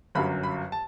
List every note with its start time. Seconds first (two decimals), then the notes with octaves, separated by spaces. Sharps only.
0.15 G1 F#2 F#3 B5
0.43 B5
0.72 A5